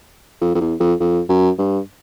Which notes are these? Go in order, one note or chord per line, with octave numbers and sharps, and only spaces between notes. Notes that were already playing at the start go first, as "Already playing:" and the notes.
F2
F2
E2
F2
F2
F#2
G2